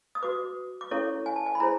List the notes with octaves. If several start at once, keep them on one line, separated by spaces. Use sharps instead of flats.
D#6
F#4 B4 D6
D6
C#4 E4 A4 C#5 C#6
G#5
A5
G#5
B5
E4 G#4 C5 A#5